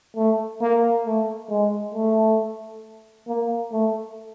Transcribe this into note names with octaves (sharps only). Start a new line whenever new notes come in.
A3
A#3
A3
G#3
A3
A#3
A3